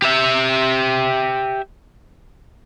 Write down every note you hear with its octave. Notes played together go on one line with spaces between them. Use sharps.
G4 E5